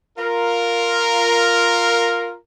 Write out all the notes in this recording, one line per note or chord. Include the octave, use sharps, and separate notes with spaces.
F4 A#4